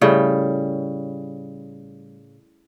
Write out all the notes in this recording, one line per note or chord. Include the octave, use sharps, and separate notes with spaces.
A2 C#3 G3